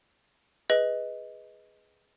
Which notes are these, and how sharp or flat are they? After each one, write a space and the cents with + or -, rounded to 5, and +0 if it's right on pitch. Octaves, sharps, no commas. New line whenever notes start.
G#4 +0 B4 +0 D#5 +10